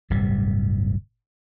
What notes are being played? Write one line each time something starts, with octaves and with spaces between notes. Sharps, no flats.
D1 G1 C3 G3